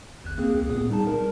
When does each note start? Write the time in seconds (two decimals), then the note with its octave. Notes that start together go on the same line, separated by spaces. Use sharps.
0.25 G#1 E2 F#6
0.38 A#3 C4 G#4
0.55 C#2
0.70 A#2 B3 G#4
0.89 G3 D#4 A5
1.07 A#4